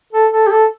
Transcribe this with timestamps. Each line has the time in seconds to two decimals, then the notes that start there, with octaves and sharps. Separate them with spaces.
0.13 A4
0.32 A4
0.46 G4
0.51 A4